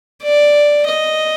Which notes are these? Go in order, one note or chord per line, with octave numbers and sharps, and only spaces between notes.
D5
D#5